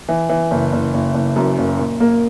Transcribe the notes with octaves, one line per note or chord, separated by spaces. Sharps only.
E3
E3
F#1
F#1
F#1
F#1
F#2
F#1
A#2
A#3